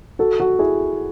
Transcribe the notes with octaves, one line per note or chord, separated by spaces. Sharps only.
F#4 A4
F#4 A4
E4 G#4